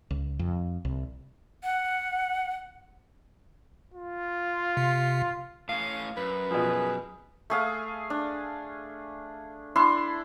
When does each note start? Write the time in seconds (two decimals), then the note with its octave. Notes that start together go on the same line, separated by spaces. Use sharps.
0.11 C#2
0.39 F2
0.85 C2
1.64 F#5
3.94 F4
4.77 C3
5.69 A2 C#4 F5
6.17 F#2 B4
6.51 B2 F3 G#4
7.50 A3 G#4 F5
8.10 D4
9.76 D4 E4 C6